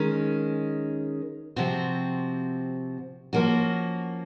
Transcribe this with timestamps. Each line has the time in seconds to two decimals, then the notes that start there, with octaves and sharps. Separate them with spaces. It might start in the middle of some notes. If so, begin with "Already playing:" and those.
Already playing: D#3 G#3 C#4
1.56 C3 F3 C4 F#4
3.33 F3 A#3 C#4 F#4